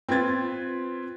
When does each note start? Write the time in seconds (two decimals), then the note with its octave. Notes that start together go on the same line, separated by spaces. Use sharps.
0.09 C4 F4 B4 G#6 A6